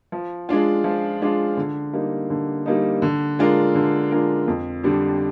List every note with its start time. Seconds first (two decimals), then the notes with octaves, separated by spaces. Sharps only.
0.12 F3
0.49 G#3 D4 F4
0.84 F3
1.22 G#3 D4 F4
1.57 D3
1.93 G3 A#3 D#4
2.30 D3
2.66 G3 A#3 D#4
3.02 D3
3.39 G#3 D4 F4 A#4
3.75 D3
4.11 G#3 D4 F4 A#4
4.48 F2
4.83 D3 G3 D4